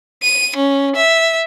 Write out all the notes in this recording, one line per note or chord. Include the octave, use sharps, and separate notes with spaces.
D#7
C#4
E5